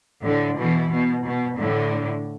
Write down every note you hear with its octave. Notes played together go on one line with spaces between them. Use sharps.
A2 D3
B2 E3
B2
B2
A2 D3